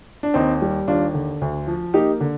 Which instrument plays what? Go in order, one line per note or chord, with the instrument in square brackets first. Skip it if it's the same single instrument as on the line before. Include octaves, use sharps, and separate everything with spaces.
[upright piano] D4
D#2 C4 D#4
G3
D#2 D4 F4
D3
D2
F3
A#3 D#4 G4
D3